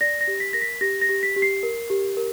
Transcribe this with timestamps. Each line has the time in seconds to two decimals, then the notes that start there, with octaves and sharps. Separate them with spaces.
0.01 D5 A#6
0.21 A#6
0.27 G4
0.40 B6
0.53 A#4 A#6
0.62 B6
0.81 G4 A#6
1.01 A#6
1.09 G4
1.23 B6
1.36 G4
1.42 C7
1.63 A#4
1.90 G4
2.17 A#4